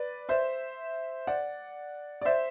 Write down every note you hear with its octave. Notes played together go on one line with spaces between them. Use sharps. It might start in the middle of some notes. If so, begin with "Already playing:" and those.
Already playing: B4 D5
C5 E5
D5 F#5
D5
C5 E5